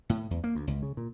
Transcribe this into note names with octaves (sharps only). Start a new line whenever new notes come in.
A2
E2
A#3
D2
C#2
C#3
A#2